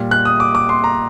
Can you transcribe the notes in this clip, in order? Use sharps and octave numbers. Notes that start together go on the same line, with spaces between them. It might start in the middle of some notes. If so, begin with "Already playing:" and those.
Already playing: A#2 G3
F#6
D#6
D6
D6
C6
A#5